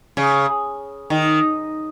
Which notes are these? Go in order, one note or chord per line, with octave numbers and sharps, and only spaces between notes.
C#3
D#3